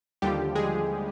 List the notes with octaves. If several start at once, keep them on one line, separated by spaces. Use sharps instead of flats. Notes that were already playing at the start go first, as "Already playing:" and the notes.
D#2 D3 F3 G3 G4
G#3 G#4